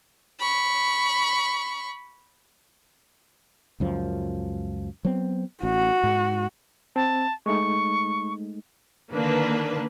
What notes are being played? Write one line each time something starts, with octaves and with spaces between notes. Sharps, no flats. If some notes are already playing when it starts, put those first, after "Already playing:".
B5 C#6
C#2 F#2 F3
F#3 B3 C4
A1 F#4
G#2
C4 A5
G#3 A3 D#4 C#6
D3 D#3 A#3 D4 B4